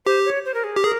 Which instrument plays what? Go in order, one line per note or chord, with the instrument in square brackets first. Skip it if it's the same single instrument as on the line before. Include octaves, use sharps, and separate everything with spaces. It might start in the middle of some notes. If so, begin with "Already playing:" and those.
[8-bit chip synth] G4 [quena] C5
[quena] C#5
C5
A#4
G#4
[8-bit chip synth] G4
[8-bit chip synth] G#4 [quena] A#4